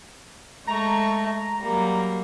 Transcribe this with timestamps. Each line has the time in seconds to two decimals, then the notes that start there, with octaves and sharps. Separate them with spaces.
0.67 G#3 A3 A#5 C#6
1.61 F#3 G3 A#3